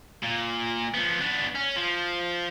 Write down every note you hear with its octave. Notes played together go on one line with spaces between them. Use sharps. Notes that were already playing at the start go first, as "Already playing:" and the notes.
A#2
F3 B3
B3 D4
C#4
F3